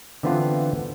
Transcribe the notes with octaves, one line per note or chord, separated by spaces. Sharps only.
D3 E3 B3 C4 F4